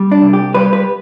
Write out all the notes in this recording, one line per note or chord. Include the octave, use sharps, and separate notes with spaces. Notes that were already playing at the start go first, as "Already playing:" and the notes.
Already playing: G3
D4
C2
G4
G3 B4
B4